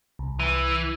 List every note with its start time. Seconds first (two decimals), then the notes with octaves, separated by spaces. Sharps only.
0.19 C2
0.39 E3